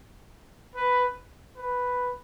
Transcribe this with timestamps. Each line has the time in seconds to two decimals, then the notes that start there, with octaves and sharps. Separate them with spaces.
0.75 B4
1.57 B4